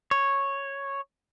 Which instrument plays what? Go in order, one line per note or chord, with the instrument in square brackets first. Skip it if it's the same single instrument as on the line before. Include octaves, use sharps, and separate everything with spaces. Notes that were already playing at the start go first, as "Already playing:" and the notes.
[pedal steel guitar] C#5